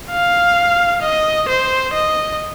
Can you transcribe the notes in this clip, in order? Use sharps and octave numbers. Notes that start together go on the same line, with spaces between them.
F5
D#5
C5
D#5